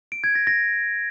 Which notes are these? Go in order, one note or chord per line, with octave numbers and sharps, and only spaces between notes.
D7
G#6
A#6
A#6